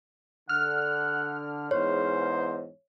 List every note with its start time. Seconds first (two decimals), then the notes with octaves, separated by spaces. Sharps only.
0.49 D3 F#5 F6
1.71 E2 G#2 C5 C#5